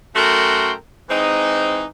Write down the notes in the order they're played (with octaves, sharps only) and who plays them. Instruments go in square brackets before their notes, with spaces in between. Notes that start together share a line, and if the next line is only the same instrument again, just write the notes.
[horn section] F#2 A3 F#4 A#4 G5 C6
E3 G#3 C4 D#4